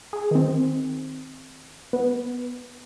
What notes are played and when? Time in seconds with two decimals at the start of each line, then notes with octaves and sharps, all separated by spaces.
0.13 G#4
0.31 D#3 C4
1.93 B3